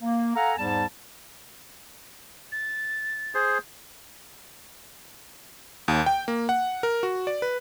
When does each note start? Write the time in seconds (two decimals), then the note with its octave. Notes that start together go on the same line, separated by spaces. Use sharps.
0.02 A#3
0.36 A4 F5 F#5 G#5 A#5
0.58 E2 G#2 G3 A5
2.52 A6
3.35 G#4 C5
5.88 D#2
6.06 G5
6.28 A#3
6.49 F#5
6.83 A#4
7.03 F#4
7.27 D5
7.42 B4